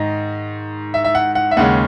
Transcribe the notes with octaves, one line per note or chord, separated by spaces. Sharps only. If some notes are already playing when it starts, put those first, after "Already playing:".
Already playing: G#2 D#3 D#5
E5
E5
F#5
F#5
E5
D#2 C#3 G#3 F#5